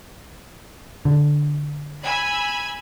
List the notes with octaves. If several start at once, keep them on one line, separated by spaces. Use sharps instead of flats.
D3
G#5 B5 E6